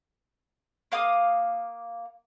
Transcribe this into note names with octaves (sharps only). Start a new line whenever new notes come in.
A#3 F5 D6 D#6